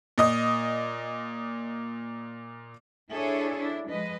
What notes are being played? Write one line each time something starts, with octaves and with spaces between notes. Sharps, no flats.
A#2 D#5 D#6
D4 E4 G#4 A4 C#5
D4 E4
F3 G#3 B4 D#5